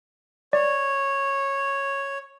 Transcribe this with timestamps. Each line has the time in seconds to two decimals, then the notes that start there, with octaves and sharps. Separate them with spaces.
0.53 C#5 D5